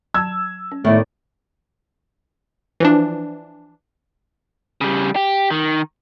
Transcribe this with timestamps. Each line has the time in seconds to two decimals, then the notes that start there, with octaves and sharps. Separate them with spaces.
0.14 F#3 A5 E6 G#6
0.72 C#4
0.84 A2 D#3 A3 B3 E4 D5
2.80 E3 F3 D4
4.81 C#3 G3
5.16 G4
5.51 D#3